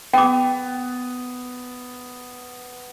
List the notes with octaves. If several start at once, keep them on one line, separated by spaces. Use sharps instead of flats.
B3 G5 D6